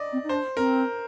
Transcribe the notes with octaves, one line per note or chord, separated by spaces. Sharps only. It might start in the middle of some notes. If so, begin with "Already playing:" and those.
Already playing: D5 D#5
C4
D#4
D4 C5
C4 A#4